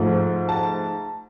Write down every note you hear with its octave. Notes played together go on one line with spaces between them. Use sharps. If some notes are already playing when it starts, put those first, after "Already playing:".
Already playing: G#2 F3 A3
A5